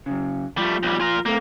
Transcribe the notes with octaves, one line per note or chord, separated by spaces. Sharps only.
C#3 F#3
F3 G3 A3
B1 G3
F4 A#4
A3 A#3 C4